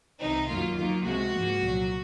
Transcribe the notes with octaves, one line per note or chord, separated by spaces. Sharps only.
C2 C3 D#3 D#4
F#2 D#3 F#3 A#3 F4
D#2 D#3 F#3 A#3 F4
C#2 C3 F3 G#3 F#4
G#2 F3 A#3
C2 A#2 F#3